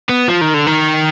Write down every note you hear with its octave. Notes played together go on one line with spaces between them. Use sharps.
B3
F3
D#3
D3
D#3